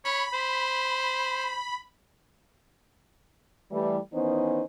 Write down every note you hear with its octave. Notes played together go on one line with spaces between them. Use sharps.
C#5 B5
C5
E3 G3 A3
D#3 E3 B3 C#4 D#4 C5